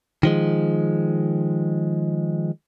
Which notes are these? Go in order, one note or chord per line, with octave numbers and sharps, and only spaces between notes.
D#3 F3 G#3